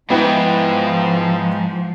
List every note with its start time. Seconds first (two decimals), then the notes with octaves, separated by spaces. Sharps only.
0.10 G#2 F3 B3 E4 G5